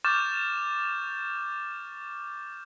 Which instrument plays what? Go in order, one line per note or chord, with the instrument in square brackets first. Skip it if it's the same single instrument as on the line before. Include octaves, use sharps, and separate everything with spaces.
[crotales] C#6 D6 F6 G6 A6 E7